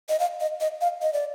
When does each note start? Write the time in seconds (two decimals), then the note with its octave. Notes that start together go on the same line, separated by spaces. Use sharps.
0.09 D#5
0.20 F5
0.40 D#5
0.61 D#5
0.81 F5
1.02 D#5
1.13 D5